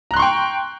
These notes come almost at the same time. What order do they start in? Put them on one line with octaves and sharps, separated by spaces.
A#5 F#6 C6 C#6 G5